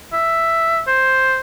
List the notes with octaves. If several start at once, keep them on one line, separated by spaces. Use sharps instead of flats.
E5
C5